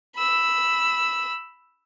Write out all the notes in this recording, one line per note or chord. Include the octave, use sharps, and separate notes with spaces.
B5 E6